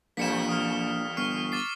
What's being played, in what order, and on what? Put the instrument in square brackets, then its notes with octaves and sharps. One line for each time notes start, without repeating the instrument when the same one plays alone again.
[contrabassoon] A#1 [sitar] E2 G3 A#3 [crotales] B6 C#7 E7
[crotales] D#6 F6
[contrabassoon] G1 [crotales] C#6 F6 C7
[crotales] D6 A6 C7